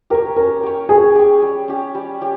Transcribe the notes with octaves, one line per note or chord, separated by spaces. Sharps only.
G4 A#4 C#5
C#4 A#4
G4 C#5
C#4 G#4
G4 C#5
G3
C#4 G4
G3
C#4 G4